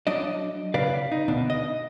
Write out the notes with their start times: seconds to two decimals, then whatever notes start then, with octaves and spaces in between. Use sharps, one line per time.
0.07 F#3 D4 D5 D#5
0.74 C#3 B4 D5 F5
1.12 D#4
1.28 D2 B2 D4
1.50 D#5